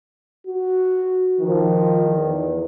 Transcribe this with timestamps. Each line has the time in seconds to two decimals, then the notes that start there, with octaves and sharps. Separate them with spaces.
0.47 F#4
1.40 D#3 F3
2.03 E2